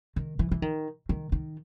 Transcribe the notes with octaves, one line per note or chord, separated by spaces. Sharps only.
D#3
E3
E3
D#3
D#3
D#3